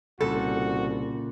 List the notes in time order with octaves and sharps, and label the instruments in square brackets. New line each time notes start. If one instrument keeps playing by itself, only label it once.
[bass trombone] C2 [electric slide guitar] A#2 C#3 G3 [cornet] F#4 [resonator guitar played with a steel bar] A4